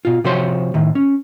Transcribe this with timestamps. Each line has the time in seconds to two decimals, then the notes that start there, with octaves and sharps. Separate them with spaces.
0.05 B2 F4
0.24 C3 F3 F#4 C5 C#5 C6
0.74 A2 D#3
0.95 C#4